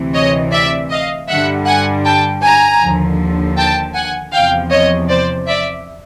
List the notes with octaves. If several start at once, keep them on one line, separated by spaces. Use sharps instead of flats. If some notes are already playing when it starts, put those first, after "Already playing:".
Already playing: D2 C3 E3
C#5 D#5
D5 E5
D#5 F5
G2 D3 G3 E5 F#5
F#5 G#5
G5 A5
G#5 A#5
D#2 D3 F3
G5 A5
F#5 G#5
E2 C3 F3 F5 G5
C#5 D#5
C5 D5
D5 E5